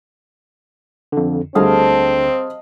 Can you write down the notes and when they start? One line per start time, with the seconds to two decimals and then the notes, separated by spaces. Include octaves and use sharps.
1.12 F2 D3
1.55 D2 D3 G3 C4 G#4 D#5 F5 A5